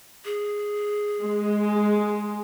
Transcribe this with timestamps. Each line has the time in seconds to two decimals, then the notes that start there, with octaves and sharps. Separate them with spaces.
0.25 G#4
1.22 G#3